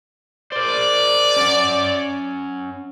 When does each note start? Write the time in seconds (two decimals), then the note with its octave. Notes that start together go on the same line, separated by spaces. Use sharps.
0.52 A#4 C5 D5
1.37 C#4 F#5